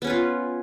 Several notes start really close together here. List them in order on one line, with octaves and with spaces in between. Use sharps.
B3 C#4 B4 F4